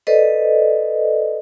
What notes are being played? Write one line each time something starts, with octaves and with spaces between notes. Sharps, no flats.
A4 B4 C5 D5 D#5